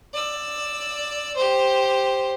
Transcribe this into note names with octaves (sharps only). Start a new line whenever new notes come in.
D5 E6
G4 C5